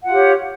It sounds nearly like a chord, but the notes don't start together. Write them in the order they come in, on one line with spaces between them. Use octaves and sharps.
F#5 F4 G4 C#5